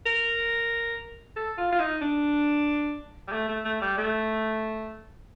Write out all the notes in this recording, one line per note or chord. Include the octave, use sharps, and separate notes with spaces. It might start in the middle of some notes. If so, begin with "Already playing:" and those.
A#4
A4
F4
F4
D#4
D4
G3
A3
A3
A3
G3
A3